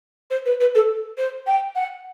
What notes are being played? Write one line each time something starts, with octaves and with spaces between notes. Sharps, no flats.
C5
B4
B4
A4
C5
G5
F#5